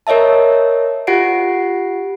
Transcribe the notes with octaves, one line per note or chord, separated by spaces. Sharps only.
A#4 C#5 D#5 E5 A5
F4 G4 F#5 C7 D7